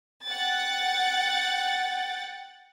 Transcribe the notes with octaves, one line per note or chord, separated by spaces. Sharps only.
F#5 G5 A6